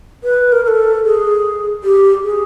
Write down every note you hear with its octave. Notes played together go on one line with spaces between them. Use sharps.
B4
A#4
A#4
A4
G#4
G4
G#4